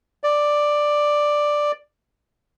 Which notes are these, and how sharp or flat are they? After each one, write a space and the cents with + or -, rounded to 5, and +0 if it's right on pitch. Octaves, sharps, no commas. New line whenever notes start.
D5 +5